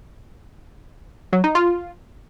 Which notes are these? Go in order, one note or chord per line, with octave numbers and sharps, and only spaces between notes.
F#3
D#4
F4